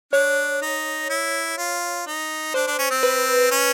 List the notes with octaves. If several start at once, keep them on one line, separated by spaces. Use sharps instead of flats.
D4 C#5
D#4
E4
F4
D#4
D4 C5
D4
C#4
C4
B4
C#4